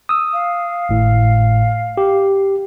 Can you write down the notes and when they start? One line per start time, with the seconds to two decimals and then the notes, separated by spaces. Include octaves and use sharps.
0.09 D#6 E6
0.33 F5
0.89 G#1 A2
1.97 G4